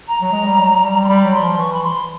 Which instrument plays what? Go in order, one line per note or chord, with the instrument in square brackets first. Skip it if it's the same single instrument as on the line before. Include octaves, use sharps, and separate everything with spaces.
[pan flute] A#5
[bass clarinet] F#3
G#3
G3
F#3
G3
[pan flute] C6
[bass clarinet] G3 [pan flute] B5
[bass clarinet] F#3
[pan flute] C6
[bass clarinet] F3
[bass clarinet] E3 [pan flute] C#6
[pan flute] B5
C6